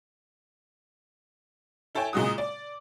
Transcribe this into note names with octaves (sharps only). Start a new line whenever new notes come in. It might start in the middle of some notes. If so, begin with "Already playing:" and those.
E4 A4 C#5 G5 G#5
A#2 C#3 G#3 F#4 D#6
D5